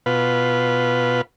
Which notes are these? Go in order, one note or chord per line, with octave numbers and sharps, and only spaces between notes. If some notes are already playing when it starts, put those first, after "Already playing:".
B2 F4 B4